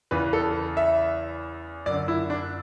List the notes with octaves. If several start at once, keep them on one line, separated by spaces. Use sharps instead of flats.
E2 C#3 E3 B4
A4
E5
F#2 D3 D5
E4
D4